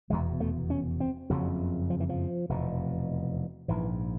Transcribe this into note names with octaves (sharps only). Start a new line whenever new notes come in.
F1 E2 B2 G#3
A3
C#4
C4
F#1 F2 C#3 F#3
F3
E3
F3
F1 E2 B2
A#1 G#2 E3